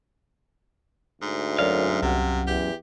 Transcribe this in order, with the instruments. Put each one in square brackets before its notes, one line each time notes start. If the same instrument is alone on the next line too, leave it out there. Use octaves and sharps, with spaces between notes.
[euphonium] D2 [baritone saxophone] G#2
[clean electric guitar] F#2 F5 [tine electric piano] A#4 C#5 D5
[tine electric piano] C2 F#5 [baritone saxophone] C3
[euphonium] E2 [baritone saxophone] G4